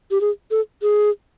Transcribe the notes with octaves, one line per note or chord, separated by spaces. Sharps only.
G4
G#4
A4
G#4